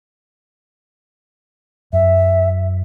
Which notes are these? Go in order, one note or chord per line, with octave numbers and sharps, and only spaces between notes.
F#2 E5